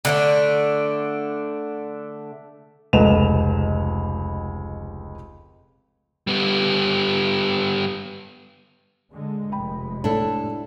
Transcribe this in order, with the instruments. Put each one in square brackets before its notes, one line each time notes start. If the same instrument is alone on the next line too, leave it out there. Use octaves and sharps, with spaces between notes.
[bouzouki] D3 A3 D4
[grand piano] F1 C#2 B4 D#5 E7 F7
[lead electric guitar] G3 B3
[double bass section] D3 G#3
[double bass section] F1 G#3 [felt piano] G5 B5
[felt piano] A2 [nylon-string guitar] D4 E4 A4